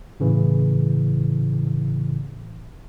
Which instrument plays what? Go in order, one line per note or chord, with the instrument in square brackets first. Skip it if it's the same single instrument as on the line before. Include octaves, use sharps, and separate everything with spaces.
[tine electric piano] A2 C#3 E3